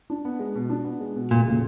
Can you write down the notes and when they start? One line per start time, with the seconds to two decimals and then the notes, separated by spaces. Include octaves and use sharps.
0.10 D4
0.25 B3
0.39 G#3
0.55 B2
0.70 D4
0.85 B3
1.00 G#3
1.16 B2
1.30 F1 A#2
1.45 C#3